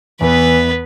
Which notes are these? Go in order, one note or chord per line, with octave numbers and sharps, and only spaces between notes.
E2 E3 B3 B4